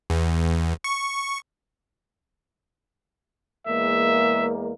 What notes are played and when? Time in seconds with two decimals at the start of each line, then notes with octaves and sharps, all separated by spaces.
0.10 E2
0.84 C#6
3.66 E2 G#3 A#3 E5